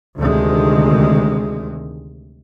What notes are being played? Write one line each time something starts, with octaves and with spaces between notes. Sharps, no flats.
D2 C3 D#3 G#3